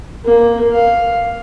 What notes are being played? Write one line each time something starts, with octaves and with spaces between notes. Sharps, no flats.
A#3
F5